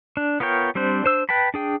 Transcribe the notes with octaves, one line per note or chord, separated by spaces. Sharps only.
D4
B3 F4 A#4 C#5 G5
G3 C4 D4 C5
D4 C5 E6
B4 G5 A5 B5
D4 G#4 G5